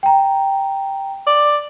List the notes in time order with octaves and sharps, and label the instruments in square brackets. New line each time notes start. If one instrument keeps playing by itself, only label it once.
[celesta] G5 A#5
[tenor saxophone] D5